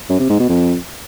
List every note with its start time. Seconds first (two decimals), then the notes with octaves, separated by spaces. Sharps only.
0.10 F#2
0.19 C3
0.29 G#2
0.39 B2
0.49 F2